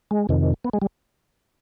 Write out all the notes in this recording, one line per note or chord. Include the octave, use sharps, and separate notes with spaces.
G#3
F2 C3 D#3
B3
G#3
G3